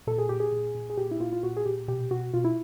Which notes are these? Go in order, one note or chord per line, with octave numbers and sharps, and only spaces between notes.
A#2 A4
G#4
A#2 G4
G#4
A#2
A#2
G#4
A#2 G4
E4
A#2 F4
F4
A#2 F#4
G#4
A#2 G4
B2 G4
B2 F#4
B2 F4
E4